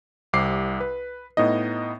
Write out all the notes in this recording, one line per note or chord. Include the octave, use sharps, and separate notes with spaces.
C2 C3 D6 C7
B4
A2 B3 D#4 D#5